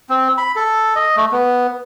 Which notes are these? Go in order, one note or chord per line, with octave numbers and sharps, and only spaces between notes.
C4
B5
A4
D#5
A3
B3